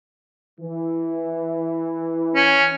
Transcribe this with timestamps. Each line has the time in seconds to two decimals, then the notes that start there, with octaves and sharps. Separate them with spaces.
0.60 E3
2.35 C#4